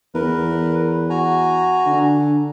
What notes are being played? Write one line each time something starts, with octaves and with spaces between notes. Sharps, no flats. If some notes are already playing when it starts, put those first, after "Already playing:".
E2 A#4 B4
F#4 G#5 A#5
D3